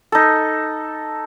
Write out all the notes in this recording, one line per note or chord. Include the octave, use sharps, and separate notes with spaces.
D#4 A4